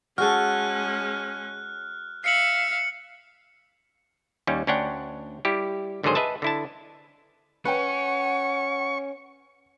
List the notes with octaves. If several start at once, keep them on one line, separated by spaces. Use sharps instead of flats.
G#3 C#4 F#4 G#4 A4 F6 F#6
E5 F5 C7 C#7 F#7
D#2 G3 C#4
D2 C#4 D4 C#5 F#5 G5
G3 E4 G4
G#1 D3 D#3 F#3 G#4 C5
G#4 B4 D#5 E5 A5
D3 E4 A5
C#4 B4 F#5 G5 C#6